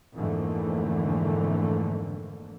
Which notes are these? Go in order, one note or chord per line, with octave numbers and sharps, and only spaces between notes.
F2 G#2 D3 E3 A3 A#3